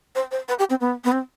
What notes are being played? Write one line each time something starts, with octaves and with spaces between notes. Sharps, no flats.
C5
C5
B4
G4
C4
B3
B3
C4